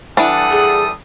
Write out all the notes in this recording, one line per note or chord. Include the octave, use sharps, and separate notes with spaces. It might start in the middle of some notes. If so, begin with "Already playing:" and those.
E3 G3 D4 A4 F#5 D#6
G#4